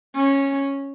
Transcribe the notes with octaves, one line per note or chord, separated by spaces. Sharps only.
C#4